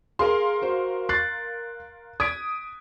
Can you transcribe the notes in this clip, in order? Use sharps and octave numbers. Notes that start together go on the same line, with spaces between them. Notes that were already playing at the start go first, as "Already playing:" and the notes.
G#4 A#4 F5 C6
F#4 C5
F#6 A6 C7
D#6 G#6 B6 D7